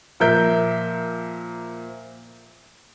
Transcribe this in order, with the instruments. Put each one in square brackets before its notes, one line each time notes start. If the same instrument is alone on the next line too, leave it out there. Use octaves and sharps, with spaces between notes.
[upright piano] A#2 F3 A#4 E5 G6